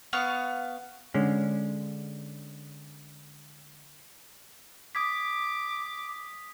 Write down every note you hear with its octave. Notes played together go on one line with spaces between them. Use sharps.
B3 F5 C#6
D3 G#3 C#4
D6 D#6 G#6 B6